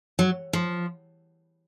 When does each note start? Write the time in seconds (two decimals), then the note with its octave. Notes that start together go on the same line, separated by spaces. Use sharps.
0.19 F#3
0.53 F3